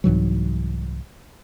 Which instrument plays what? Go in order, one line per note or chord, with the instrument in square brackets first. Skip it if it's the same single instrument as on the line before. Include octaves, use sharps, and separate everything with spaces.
[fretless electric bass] C2 G#2 E3 F#3